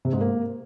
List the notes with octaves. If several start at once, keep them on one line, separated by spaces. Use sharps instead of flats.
C3
G#2
A#3